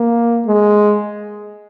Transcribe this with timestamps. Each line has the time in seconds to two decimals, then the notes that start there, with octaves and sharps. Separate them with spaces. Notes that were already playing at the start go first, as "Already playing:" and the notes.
Already playing: A#3
0.46 G#3